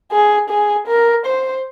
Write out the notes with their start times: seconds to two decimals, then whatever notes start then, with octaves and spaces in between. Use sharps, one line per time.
0.12 G#4
0.50 G#4
0.88 A#4
1.26 C5